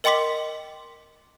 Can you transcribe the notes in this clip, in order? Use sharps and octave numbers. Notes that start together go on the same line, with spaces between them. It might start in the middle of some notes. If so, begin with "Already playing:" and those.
A#4 D#5 G5 C6 D6 B6